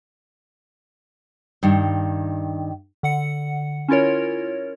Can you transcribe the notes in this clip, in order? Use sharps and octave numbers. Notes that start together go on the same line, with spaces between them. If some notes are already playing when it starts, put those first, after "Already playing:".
G2 D#3
D3 F#5 C#7
C#4 E4 F4 A#4 C#5